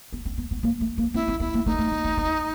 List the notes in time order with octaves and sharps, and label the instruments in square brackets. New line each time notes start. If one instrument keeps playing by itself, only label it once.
[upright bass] B3
C4
B3
B3
A#3
A3
A#3
[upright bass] C4 [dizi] E4
[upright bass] C4
[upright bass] B3 [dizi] E4
[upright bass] A#3
[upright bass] A3 [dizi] D#4
[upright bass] A3
A#3
B3
B3